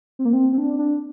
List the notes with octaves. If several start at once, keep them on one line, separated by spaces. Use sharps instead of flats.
C4
A#3
C4
C4
D4
D4